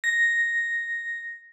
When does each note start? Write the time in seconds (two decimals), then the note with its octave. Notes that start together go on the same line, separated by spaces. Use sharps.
0.04 A#6